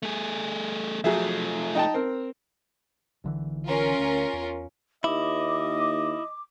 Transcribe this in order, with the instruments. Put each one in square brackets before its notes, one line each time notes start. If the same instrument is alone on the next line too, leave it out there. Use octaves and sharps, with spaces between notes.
[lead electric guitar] A3 G#4
[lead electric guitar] F3 A3 [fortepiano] F#3 G#4 E5
[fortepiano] D#4 G5 A5
C4 A#4
[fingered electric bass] B1 D3 E3
[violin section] C#4 F4 A#4
[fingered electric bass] D2
E2
[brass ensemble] D#2 [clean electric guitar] E4 [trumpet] D#5 [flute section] D6